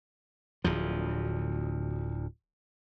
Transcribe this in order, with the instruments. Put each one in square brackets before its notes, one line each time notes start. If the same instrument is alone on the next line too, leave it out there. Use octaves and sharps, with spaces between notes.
[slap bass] D1 D2 F3